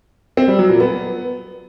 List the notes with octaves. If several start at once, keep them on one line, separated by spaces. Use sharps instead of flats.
C4
G3
F#3
A#2
B3